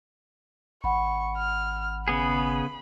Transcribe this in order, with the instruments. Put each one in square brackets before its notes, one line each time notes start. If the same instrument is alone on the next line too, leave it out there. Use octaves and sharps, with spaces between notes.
[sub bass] G#1 [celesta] F#5 B5 [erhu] C#6
[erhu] F6
[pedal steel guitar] C#3 B3 G#4 [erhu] B5